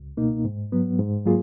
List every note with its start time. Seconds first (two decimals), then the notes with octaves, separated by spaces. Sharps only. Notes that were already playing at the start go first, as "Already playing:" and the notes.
Already playing: C#2
0.17 B2 A#3 D#4
0.45 G#2
0.72 F#3 B3
0.99 G#2
1.25 F#3 A#3 F4 G#4